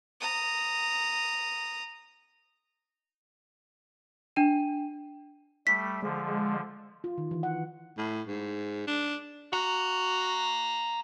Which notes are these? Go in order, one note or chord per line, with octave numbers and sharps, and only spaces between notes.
A#5 D#6
D4 G5 D#7
G3 A3 B6
D3 F3 G#3
F4
D#3
E3
F#5
A2
G#2
D4
F#4 F5 A#5